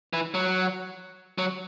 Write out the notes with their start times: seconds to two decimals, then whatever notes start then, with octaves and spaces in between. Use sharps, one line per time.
0.13 E3
0.34 F#3
1.38 F#3